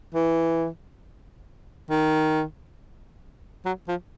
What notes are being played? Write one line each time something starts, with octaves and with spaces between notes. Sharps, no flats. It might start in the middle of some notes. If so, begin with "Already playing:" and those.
E3
D#3
F#3
F3